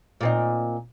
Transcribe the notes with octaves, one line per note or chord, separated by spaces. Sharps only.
A#2 C4 D#4